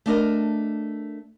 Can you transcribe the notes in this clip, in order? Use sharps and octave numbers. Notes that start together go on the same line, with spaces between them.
A3 D4 A#4 D#5